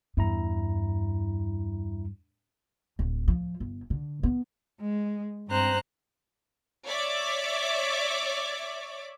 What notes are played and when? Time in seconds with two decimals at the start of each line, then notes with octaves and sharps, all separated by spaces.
0.17 E2 G2 E4 A#5
2.99 D1
3.28 F3
3.60 G1
3.90 D3
4.23 B3
4.80 G#3
5.48 G2 C4 C5 A#5 F#6
6.86 C#5 D5 E5 D6